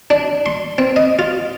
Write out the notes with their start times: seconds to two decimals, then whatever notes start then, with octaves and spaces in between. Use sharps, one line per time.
0.10 D4
0.46 C6
0.78 C4
0.96 D#5
1.19 F4